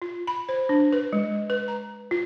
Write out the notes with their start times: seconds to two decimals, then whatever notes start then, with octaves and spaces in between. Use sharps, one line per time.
0.02 F4
0.27 B5
0.49 C5
0.69 D4
0.93 B4
1.13 G#3
1.50 B4
1.68 A#5
2.11 F4